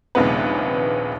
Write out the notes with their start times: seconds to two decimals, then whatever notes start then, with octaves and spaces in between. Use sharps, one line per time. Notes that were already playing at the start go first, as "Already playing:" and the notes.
0.15 A#1 D#2 C3 G#3 B3 B4